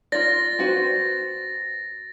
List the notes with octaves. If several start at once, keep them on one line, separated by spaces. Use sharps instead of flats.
F4 D5 A6 A#6
C4 F#4 B4